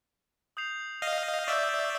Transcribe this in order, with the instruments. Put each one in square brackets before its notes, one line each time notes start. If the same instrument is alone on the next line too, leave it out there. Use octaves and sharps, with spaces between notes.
[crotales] D#6 G6 C7 F7
[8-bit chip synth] D#5 F5
[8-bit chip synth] D5 E5 [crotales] C#6 E6 G6